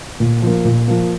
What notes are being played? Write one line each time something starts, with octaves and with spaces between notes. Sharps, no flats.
A#2
F3 A#3
A#2
F3 A#3